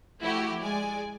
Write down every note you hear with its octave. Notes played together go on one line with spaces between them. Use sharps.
F3 A3 E4 F#4 G4
G#3 D5 G#5